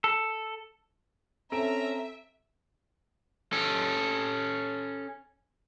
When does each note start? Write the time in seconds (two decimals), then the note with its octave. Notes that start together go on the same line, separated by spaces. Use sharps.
0.04 A4
1.52 C4 C#4 A4 E5 A#5 D7
3.53 C#4 A4